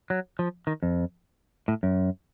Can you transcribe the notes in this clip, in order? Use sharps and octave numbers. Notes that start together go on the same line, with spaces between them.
F#3
F3
D#3
F2
A2
F#2